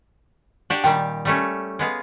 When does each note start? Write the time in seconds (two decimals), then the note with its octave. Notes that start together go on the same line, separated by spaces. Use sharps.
0.70 D4 F#4 G4
0.84 A#2 D#3 G3 G5
1.25 G3 A3 C#4
1.79 G#3 B3 F5